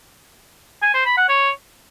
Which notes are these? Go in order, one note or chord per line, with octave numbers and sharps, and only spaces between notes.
G#5
C5
B5
F#5
C#5